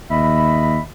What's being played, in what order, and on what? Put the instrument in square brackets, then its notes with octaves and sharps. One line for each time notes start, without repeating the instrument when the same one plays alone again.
[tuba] D#2 [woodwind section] D#5 E5 B5